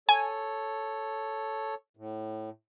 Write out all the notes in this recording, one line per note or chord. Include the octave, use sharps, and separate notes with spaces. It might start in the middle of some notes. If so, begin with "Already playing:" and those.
A4 C#5 G#5
A2